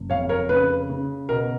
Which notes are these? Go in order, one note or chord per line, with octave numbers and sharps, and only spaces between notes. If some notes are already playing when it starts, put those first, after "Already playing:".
Already playing: F#1
F2 C#5 F5
A#4 C#5
C#3 B4
C#3
B2 A#4